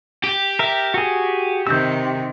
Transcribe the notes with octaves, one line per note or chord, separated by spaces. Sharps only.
G4
A#4 E5
F#4 G#4
C3 D#3 E6 G6